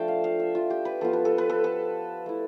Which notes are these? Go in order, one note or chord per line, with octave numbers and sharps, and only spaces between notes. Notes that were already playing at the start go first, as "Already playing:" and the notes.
Already playing: F3 A3 D4 F4 G5 A5
F5
F5
E5
F4
G4
B4
F3 B3 F4 A4
B4
A4
B4
A4
A4
A3 E4